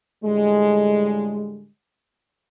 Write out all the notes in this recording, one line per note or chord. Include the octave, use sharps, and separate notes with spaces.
A2 D3 G3 G#3